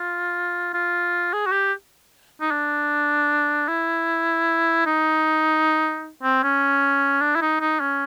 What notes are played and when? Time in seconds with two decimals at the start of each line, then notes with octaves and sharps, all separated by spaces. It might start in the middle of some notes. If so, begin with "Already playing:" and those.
Already playing: F4
0.74 F4
1.33 G#4
1.46 F#4
1.52 G4
2.41 D#4
2.51 D4
3.68 E4
4.86 D#4
6.23 C4
6.43 C#4
7.21 D4
7.35 E4
7.42 D#4
7.61 D#4
7.80 C#4